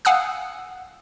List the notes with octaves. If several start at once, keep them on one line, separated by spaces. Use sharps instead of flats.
F5 F#5 G#5 D#6 E6 F#6